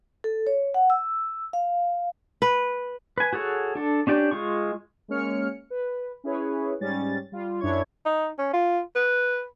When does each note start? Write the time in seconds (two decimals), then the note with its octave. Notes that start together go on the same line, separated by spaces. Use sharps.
0.24 A4
0.47 C#5
0.74 F#5
0.90 E6
1.53 F5
2.42 B4
3.18 B4 G#5
3.33 F#4 G#4 A4 C#5
3.75 D4 A4
4.07 C#4 D4 G4 D5
4.31 G#3 F4 C#6
5.08 G#3 A#3 C#4 C#5 F6 C#7
5.70 B4
6.24 C#4 E4 G#4 B4 C#5
6.80 G#2 G3 C#4 A6
7.32 G3 F4
7.60 F#2 D4 E4 C#5 C#6 G#6
8.06 D#4
8.39 C#4
8.53 F4
8.96 B4